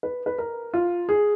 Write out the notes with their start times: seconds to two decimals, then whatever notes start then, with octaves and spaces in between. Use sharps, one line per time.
0.03 B4
0.26 B4
0.38 A#4
0.74 F4
1.09 G#4